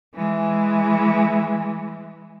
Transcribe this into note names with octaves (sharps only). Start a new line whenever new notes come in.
E3 G#3